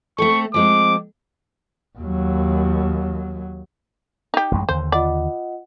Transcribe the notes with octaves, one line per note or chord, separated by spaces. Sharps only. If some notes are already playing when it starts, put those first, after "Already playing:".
A3 C4 A4 C#6
F3 G#3 C4 D6
D#2 F#3
D#4 G4
A1 F#2 G#3
D#2 D3 C5
F4 D5 D#5 F#5